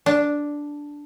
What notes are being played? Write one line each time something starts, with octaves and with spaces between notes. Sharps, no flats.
D4